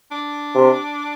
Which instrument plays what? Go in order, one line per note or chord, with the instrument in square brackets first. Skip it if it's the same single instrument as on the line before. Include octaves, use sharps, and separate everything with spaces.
[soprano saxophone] D4
[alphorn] C3